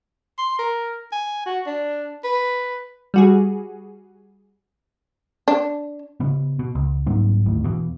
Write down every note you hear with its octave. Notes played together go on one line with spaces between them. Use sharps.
C6
A#4
G#5
F#4
D4
B4
G3 F#4 G#4
D4
C#3 B3
B2
C#2
C2 G#2 F#3 A#3
G#1 D2 A2
E2 B2